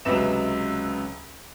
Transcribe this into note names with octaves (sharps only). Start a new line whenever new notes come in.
C#2 C3 F#3 B4 E5 E7